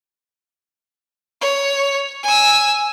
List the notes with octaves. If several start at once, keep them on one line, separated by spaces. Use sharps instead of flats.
C#5
G#5 E6